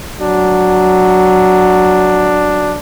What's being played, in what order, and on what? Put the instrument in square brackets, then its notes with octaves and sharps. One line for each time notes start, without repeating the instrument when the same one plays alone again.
[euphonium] F#3 [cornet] D4